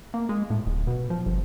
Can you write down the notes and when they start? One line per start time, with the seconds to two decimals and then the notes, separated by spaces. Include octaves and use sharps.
0.14 A#3
0.29 G#3
0.50 A2
0.66 D1
0.87 B2
1.10 F3
1.26 G1